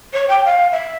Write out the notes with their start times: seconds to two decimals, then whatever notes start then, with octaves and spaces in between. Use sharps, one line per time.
0.13 C#5
0.29 G5
0.45 F5
0.72 E5